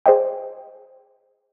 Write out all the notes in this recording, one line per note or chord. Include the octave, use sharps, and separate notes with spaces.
G#4 C5 D5 D#5 G5